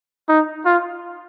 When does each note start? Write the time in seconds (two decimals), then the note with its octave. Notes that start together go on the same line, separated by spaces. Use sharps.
0.29 D#4
0.65 F4